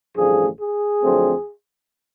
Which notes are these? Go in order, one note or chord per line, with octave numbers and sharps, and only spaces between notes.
A1 G2 D3 F3 A3 G#4
G#4
F2 D3 F#3 A3 C4